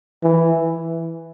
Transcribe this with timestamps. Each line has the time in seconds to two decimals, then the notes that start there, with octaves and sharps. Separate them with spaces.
0.23 E3